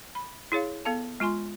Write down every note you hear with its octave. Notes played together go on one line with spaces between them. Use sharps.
B5
E4 G#4 C#5 F5
B3 A4 F5 A5
G#3 F4 G#5 C6